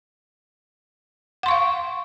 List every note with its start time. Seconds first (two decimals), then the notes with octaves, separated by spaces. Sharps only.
1.43 F#5
1.46 C6
1.48 C#6
1.51 F5